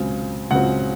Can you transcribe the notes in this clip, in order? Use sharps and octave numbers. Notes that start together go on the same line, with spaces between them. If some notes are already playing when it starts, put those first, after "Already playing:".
Already playing: C#2 C#3 F#3 C4
C#2 C#3 F#3 C4 F#5